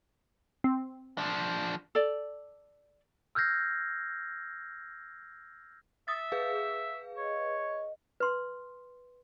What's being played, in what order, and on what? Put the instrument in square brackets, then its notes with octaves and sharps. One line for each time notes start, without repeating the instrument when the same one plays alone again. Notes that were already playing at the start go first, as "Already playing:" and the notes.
[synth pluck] C4
[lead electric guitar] F3 D4
[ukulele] A4 D5
[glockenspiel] E6 F6 G6 G#6 A#6 C7
[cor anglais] E5 [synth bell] D#6 A6
[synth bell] G#4 B4 F5
[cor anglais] C#5 [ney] D#5
[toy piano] B4 C6